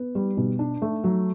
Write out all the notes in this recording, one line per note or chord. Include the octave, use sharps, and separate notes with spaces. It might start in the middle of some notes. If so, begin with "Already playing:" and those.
Already playing: B3
G3
B2
D4
A3
F#3